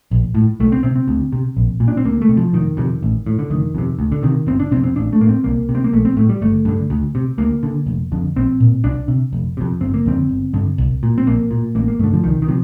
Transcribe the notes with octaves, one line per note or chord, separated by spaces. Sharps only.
A#1
A2
C2 A3
C4
C3 C4
C4
D2
C3
A#1
A#2
D4
C4
D2 A#3
A3
C3
F3
F1 D#3
F2 C3
A1
A2
D3
F1 D#3
F2 C3
D2
D3
C3 D#3
G1 C4
D4
C3 C4
F2
C4
A1 D4
A3
A2 A#3
C4
C2 A#3
C3
C4
A#3
A#1 A3
C4
A2 A3
G3
G1 A3
G2 D3
D2
C3
D2 A#3
D3
F1
F2 D3
A#1 C4
A#2
C2 D4
C3
F1
F2 C3
G1 C4
A#3
F2 D3 C4
G1
G2 D3
C2
A#2
C4
A#1 A#3
A#2
A1 A#3
A#3
G2 D3 A3
F3
C2 D#3
D#3
C3 F3